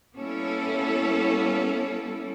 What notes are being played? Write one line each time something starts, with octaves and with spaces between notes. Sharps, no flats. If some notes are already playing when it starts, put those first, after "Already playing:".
G3 A#3 B3 C#4 E4 A4